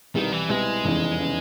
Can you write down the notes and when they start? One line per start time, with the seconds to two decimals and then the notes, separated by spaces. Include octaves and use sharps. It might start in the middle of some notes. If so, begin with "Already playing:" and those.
0.15 C2 B2 D#3 G3 B3 E4
0.32 E3
0.49 C2 B2 G3 G#3 B3 E4
0.84 F1 E2 C#3 E3
1.18 C#3 E3